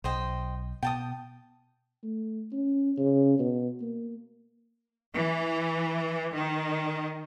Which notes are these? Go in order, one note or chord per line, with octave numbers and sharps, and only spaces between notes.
B1 C5 D#5 G5
B2 G5 A5 D#6
A3
C#4
C#3
B2
A#3
E3
D#3